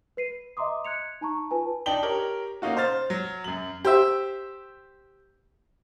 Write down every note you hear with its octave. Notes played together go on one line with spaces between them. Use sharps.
B4 C7 D#7
D#5 E5 A#5 C6 D6 D#6
F#6 G#6 C#7 F7
D#4 A5 A#5 C#6
F4 B4 G#5 A5
D4 D#4 G5 A5 F#7 G7
G4 A#4 C#5
A#3 C#4 D#4 F4 F#4
C5 F6 A6
F#3
F#2 F#7
G4 C5 E5